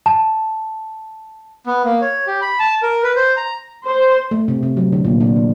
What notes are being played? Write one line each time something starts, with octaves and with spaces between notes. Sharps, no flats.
A5
B3
A#3
C#5
G4
B5
A5
A#4
B4
C5
A#5
C5
A3
C3
C3
F#3
D3
A#2
D4
E3